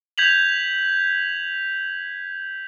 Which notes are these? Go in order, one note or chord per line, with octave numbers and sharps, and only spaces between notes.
G6 G#6 B6 F7 F#7